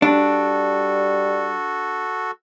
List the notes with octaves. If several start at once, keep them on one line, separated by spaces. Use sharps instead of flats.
G3 D4 F#4 A4